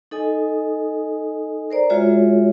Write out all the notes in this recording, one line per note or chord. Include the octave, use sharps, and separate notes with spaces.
D#4 A4 D#5 G#5 D#6
A#4 C5 D5 A#5
G#3 F4 F#4 G#4 C#5 E5